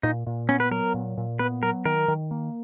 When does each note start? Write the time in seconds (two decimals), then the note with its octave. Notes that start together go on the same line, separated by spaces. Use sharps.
0.03 A#2 D#4
0.26 A#2
0.49 B3 C#4
0.60 B4
0.71 F#3 A#4
0.94 A#2
1.17 A#2
1.39 B3 B4
1.62 F#3 A#4
1.85 D#3 A#4
2.08 D#3
2.31 A#3